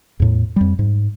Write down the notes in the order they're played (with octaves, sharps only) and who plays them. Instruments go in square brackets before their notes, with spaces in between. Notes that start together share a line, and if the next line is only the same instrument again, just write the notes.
[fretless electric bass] E2 A2
F2 G3
G#2